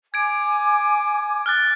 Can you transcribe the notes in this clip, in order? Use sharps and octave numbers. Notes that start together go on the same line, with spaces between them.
G#5 D6 G#6 D7
F6 F#6 A6